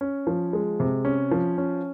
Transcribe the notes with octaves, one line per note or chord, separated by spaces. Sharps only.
C#4
F3
G#3
C3
C#4
F3
C#4